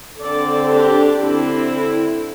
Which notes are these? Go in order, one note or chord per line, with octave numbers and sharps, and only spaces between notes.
D3 C4 A4 D5
D4 G4
D3 C4 E4